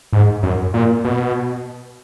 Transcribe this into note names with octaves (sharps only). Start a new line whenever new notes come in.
G#2
F#2
A#2
B2